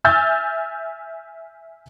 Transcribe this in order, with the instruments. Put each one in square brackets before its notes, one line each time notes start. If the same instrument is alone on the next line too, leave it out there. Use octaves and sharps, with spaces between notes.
[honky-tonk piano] E5 G#5 E6 F6 G6 A6